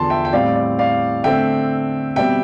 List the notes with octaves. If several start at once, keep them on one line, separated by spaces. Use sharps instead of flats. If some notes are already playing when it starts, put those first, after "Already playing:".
Already playing: E2 D3 F3 A5 C6
E5 G5
G5
A2 G3 C4 D5 F5
D5
D5 F5
D3 A3 C4 E5 G5
B2 G3 C4 E5 G5